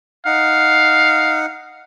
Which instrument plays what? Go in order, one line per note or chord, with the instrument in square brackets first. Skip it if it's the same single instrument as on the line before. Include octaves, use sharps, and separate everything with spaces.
[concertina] D#4 F#5 [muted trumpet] F5